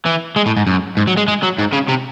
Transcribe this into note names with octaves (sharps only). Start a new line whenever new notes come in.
E3
G#3
A2
G#2
F#2
G#2
F#3
G#3
G#3
F#3
G#2
C#3
C3